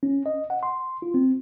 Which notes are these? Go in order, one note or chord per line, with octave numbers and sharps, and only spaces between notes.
C#4
D#5
F#5
C6
F4
C4